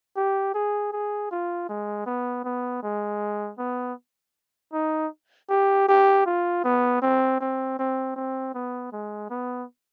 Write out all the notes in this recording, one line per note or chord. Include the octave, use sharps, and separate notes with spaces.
G4
G#4
G#4
F4
G#3
B3
B3
G#3
B3
D#4
G4
G4
F4
B3
C4
C4
C4
C4
B3
G#3
B3